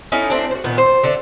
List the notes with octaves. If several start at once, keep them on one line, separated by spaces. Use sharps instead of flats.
C#4 D#4 E4 A4
A3 C4 D4
F#4 C5
A#2 D#3 B3
C5
D3 A4 E5